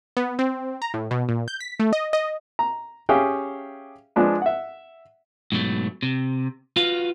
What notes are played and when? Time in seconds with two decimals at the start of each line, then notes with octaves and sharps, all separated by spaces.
0.17 B3
0.39 C4
0.82 A#5
0.94 A2
1.11 B2
1.29 A#2
1.48 G6
1.60 B6
1.80 A3
1.93 D#5
2.13 D#5
2.59 A#5
3.09 C#4 G4 G#4 E5 F5 G5
4.16 F3 G#3 D4 B4
4.42 E5 F#5
5.52 G#2 B2 F#3 A3
6.03 C3
6.76 F4 F#4 B4 F5